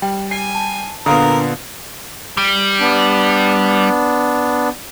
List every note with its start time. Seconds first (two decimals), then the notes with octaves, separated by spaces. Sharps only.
0.02 G3 G5
0.31 G#5 C7
0.55 A5
1.06 A#2 D3 B3 D4 A#4 F5 D#6
2.37 G3
2.80 B3 D4